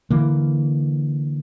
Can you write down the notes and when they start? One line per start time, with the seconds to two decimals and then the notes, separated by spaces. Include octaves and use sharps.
0.11 D3 E3 A#3